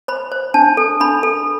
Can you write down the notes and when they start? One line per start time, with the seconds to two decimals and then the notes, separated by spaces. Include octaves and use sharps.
0.08 C5 B5
0.32 C5
0.54 D4 A5
0.77 A4
1.00 D4 B5
1.23 A4